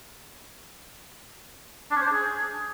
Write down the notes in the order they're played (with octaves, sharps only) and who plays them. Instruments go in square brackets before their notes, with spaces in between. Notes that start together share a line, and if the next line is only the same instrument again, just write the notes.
[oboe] D4
C#4
C5
D4
G#4